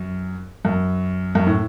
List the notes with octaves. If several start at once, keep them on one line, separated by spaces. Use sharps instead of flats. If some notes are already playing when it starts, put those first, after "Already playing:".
Already playing: F#2
F#2
F#2
A2